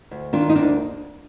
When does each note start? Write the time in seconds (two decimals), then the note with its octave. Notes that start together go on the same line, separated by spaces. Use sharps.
0.11 D2
0.33 D#3 D4 F4
0.49 D#4
0.55 D2 A#3 D4